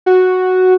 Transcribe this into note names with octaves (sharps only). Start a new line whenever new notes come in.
F#4